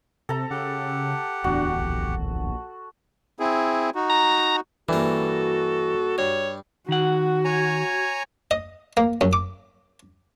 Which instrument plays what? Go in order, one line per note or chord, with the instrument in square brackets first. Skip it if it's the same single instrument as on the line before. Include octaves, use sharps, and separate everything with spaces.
[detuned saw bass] C3 [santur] A4 A#5
[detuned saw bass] C#3 [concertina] G4 F#5
[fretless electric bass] D1 E2 [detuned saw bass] D4 [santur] F#4
[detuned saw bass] A#1
[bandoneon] C4 E4 G#4
D#4 F#4
[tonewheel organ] A#5
[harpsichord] G2 A#3 [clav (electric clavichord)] E3 [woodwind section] F#4 [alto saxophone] A4
[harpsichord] G2 [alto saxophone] C#5
[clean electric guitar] D#3 F#5 [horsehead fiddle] F#4
[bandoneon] C#5 G#5 A#5
[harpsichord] D#5
A#3
F#2
D6